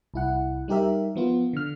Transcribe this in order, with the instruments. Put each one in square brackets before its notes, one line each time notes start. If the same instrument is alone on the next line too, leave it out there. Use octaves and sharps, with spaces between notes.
[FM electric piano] C2 E4 F#5
G3 D#4 G4 A#4 E5
F3 B3 F4
D3 F6